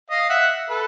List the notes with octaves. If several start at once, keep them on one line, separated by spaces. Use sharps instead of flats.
D#5 F5
E5 F#5
A4 B4